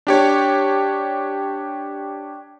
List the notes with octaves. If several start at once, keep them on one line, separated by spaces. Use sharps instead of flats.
D4 G4 C#5